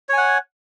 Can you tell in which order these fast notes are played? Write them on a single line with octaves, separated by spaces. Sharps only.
C#5 G#5 F#5